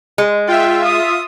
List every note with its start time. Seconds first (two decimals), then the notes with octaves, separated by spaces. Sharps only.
0.18 G#3
0.48 F4 E5 G5
0.85 D#6